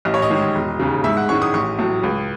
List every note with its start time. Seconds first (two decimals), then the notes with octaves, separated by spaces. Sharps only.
0.05 A1 D#5
0.14 C#5
0.22 D#5
0.30 G#2 D#3 G#3
0.55 E1
0.79 D#2 C#3
1.04 G#2 E5
1.17 F#5
1.29 D#3 G#3 C#4 C#6
1.42 D#6
1.54 A1 C#6
1.79 A2 F#3
2.03 C#2